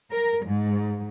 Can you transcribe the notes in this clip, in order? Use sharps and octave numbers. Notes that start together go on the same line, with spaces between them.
A#4
G#2